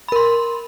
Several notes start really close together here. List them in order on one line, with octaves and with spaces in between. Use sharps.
B5 A#4 C6